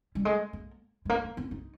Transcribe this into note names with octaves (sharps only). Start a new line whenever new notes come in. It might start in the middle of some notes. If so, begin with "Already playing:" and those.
G3
G#3
A#3
G#3
A#3
A#3
B3
D#4